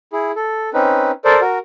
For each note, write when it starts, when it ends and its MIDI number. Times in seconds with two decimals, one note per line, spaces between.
0.13 0.31 64
0.13 0.31 68
0.36 0.70 69
0.74 1.11 60
0.74 1.11 61
0.74 1.11 63
0.74 1.11 71
1.25 1.40 69
1.25 1.40 70
1.25 1.40 72
1.25 1.40 74
1.41 1.59 66
1.41 1.59 70